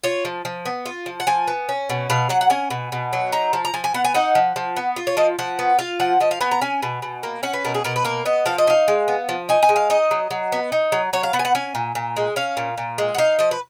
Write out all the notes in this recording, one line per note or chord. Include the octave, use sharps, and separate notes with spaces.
F4 C#5
F3
F3
B3
F4
F3
F#5
F3 G#5
B3
C#4
B2
B2 F5
F#3 F#5
F#5
C#4 G#5
B2
B2
F#3
D#4 A#5
F3
A#5
F3 G#5
G#5
B3 F#5
G#5
D#4 F#5
F3
F3
B3
F4
C#5
F3 D#5
F3 F#5
B3
F4 F5
F3 F#5
F3 D#5
F5
B3 G#5
A#5
C#4 G#5
B2
B2
A#3
C#4 F#5
B4
B2 A#4
G#4
B2 A#4
B4
A#3 A#4
B3 D#5
F3 F5
D#5
D#4 F5
G#3
B3
F3
D#4 G#5
G#5
G#3
F5
D#4 D#5
F#3
F#3
B3
D#4
F#3
F#3 C#5
F5
B3 F#5
G#5
F#5
C#4 G#5
A#2
A#2
G#3
C#4 F5
A#2
A#2
G#3
F#5
D#4 F5
F3 D#5
B4